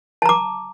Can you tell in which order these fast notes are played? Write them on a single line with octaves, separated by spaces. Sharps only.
A5 A#5 D6